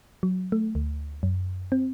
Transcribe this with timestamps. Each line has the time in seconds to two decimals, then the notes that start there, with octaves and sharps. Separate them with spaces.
0.23 F#3
0.52 A3
0.75 D2
1.23 F#2
1.72 C4